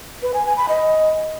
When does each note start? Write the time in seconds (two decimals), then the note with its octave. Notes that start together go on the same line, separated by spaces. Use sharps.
0.22 B4
0.34 G#5
0.46 G#5
0.57 B5
0.69 D#5